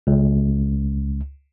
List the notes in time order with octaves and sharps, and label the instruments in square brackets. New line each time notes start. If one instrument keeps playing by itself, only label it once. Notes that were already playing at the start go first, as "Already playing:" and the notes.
[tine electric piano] C#2